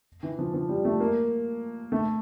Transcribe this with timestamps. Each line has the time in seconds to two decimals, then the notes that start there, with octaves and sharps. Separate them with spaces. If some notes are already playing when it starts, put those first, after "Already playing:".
0.23 E3
0.39 F3
0.54 F3
0.69 G3
0.85 A3
1.00 A#3
1.92 A3